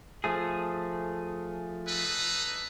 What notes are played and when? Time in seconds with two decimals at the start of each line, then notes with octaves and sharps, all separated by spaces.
0.24 F3 A3 G#4
1.87 D#4 A4 B4